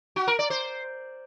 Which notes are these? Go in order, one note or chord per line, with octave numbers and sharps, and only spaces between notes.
F#4
A#4
D5
C5